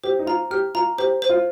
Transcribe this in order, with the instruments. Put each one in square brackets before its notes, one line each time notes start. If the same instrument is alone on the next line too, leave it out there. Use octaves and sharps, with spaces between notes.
[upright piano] G4 [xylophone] C5
[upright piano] D#4
[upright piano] F4 [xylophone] A#5
[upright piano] G4 [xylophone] F6
[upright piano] F4 [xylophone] A#5
[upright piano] G4 [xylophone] C5
[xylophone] C5
[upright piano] F4